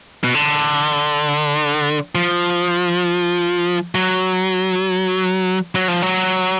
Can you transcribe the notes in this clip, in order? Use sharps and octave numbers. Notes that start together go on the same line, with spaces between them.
B2
D3
F3
F#3
F#3
F3
F#3